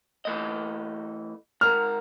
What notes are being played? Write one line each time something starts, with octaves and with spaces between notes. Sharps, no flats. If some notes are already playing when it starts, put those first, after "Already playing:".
E3 A3 D#5
G#2 A#4 F6